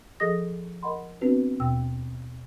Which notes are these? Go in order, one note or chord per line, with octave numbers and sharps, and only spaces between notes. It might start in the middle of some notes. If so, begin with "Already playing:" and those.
F3 G#4 A4 D#5 D#6 A#6
A#4 D#5 F#5 B5 C6
B3 C4 D4 F#4 B4
D#2 B2 G5 E6